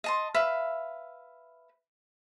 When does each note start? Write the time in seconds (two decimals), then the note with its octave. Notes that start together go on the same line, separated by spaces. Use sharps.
0.04 D#5 A5 C6
0.34 B4 E5 F5